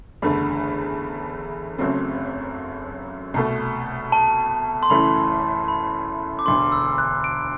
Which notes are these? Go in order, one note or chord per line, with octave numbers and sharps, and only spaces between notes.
F#1 E2 D3 A3 B5
F#1 F#2 F#3 A3 C4
C2 B2 A3
A5
C6
F#1 F#2 E3 A3 B5
B5
D6
E1 D2 D3 C6
E6
F#6
D7